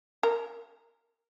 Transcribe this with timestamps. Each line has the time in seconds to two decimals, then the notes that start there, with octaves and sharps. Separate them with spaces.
0.23 A#4